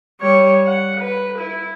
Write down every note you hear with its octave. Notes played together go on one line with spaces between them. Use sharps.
G3 C#5
F#5
B4
E4